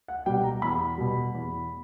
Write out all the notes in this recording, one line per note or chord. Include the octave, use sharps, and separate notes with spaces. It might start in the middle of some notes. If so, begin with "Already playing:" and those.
F#5
B2 G3 G5
A#5
E2 B5
B2 G3
E2